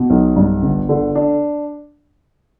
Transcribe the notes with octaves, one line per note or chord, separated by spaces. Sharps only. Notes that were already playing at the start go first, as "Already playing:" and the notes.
Already playing: B2
B1
G2
G1
D3
D4